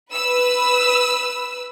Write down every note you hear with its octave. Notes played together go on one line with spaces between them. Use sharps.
B4 E6